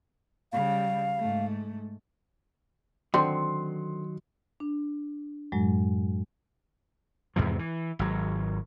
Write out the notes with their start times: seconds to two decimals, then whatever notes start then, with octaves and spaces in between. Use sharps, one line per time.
0.52 C#3 G3 F5
1.19 G#2 A3
3.14 D3 D#3 F#3 C4 C6
4.60 D4
5.52 F#2 A2 F#3 G#3
7.36 E2 G#2 C3 F3
7.59 E3
7.99 G#1 F#3